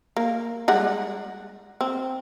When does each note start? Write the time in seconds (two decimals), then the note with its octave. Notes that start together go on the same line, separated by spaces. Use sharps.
0.17 A#3
0.68 G3 G#3 F#5
1.81 C4